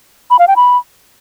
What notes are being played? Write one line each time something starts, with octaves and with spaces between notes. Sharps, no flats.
B5
F5
G5
B5